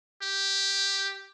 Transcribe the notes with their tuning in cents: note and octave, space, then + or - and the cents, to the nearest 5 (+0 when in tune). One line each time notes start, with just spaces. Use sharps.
G4 +0